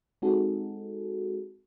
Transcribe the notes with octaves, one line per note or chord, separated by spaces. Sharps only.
G#3 C4 D#4 F#4 G#4 A4